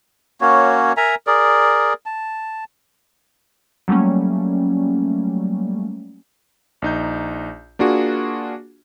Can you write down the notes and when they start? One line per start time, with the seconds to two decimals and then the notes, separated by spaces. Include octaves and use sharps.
0.41 A#3 C#4 F#4 C#5
0.97 A#4 E5 G#5 A#5
1.27 G#4 A#4 D5
2.06 A5
3.88 F#3 G3 A3 A#3 C#4
6.82 A#1 D#4 G6
7.79 A#3 D4 F4 F#4 G#4